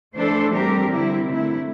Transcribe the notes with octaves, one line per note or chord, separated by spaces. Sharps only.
E3 A3 D4 A4 C5
E3 G3 C4 G4 A#4
D3 G3 C4 E4
D3 A3 E4